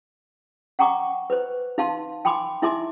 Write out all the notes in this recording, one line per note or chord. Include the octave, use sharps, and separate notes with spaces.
F#5 G5 A#5 C#6 D6
B4 C5
D#4 F5 A5 C6
G5 G#5 B5 C6 D6
D#4 E4 E5 G#5 C6 D6